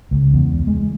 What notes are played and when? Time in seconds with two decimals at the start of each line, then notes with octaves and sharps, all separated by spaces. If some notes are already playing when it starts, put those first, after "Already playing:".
0.11 C#2
0.33 E2
0.67 G#3